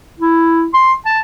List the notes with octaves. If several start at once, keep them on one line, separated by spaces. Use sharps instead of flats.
E4
C6
A5